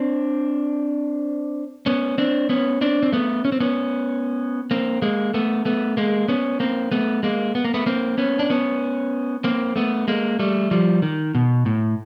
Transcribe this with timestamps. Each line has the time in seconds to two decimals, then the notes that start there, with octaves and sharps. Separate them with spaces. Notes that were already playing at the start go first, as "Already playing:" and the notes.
Already playing: C4 D4
1.86 B3 C#4
2.18 C4 D4
2.49 B3 C#4
2.81 C4 D4
3.03 C4
3.12 A3 B3
3.45 C#4
3.52 C4
3.60 B3 C#4
4.71 A#3 C4
5.02 G#3 A#3
5.34 A3 B3
5.65 A3 B3
5.97 G#3 A#3
6.28 B3 C#4
6.60 A#3 C4
6.92 A3 B3
7.23 G#3 A#3
7.55 B3
7.65 A#3
7.74 A3 B3
7.86 A#3 C4
8.18 B3 C#4
8.39 D4
8.50 B3 C#4
9.44 A#3 C4
9.76 A3 B3
10.08 G#3 A#3
10.39 G3 A3
10.71 F3 G3
11.02 D#3
11.35 B2
11.66 A2